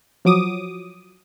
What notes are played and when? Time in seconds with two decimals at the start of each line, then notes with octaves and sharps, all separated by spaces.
0.25 F3 F#3 D6 D#6